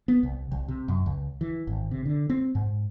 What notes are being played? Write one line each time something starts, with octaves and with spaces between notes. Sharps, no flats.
B3
C2
C2
C3
F#2
C#2
E3
G#1
C3
D3
C4
G#2